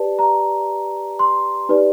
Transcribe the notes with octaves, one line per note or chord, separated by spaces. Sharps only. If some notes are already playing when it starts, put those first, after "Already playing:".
Already playing: G4 B4 D5 A5
A#5
C6
D#4 G4 B4 D5